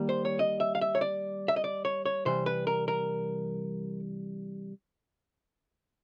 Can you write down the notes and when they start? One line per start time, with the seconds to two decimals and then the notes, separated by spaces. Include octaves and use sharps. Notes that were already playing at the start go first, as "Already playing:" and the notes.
Already playing: D#3 G3 A#3
0.09 C5
0.25 C#5
0.39 D#5
0.60 E5
0.75 F5
0.81 E5
0.95 C#5
1.01 D5
1.48 E5
1.56 D#5
1.64 D5
1.85 C#5
2.06 C#5
2.26 C3 E3 G3 C5
2.46 B4
2.67 A#4
2.88 A#4